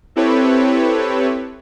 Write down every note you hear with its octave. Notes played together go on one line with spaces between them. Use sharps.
C4 E4 G4 A4 B4 C#5